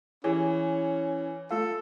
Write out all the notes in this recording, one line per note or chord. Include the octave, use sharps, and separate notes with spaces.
E3 C#4 G4 G#4 C#5
A3 F4 A4 F5